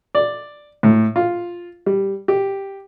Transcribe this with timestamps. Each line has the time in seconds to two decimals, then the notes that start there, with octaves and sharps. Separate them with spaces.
0.15 D5
0.83 A2
1.16 F4
1.86 G3
2.28 G4